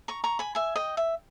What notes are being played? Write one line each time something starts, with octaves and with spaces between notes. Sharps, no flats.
A#5 C#6
A#5 C#6
G#5 B5
E5 G#5
D#5 G5
E5